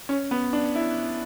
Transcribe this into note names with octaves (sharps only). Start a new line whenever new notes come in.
C#4
B3
D4
E4